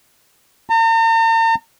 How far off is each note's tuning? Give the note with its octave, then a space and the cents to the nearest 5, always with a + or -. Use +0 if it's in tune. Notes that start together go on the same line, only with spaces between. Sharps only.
A#5 -45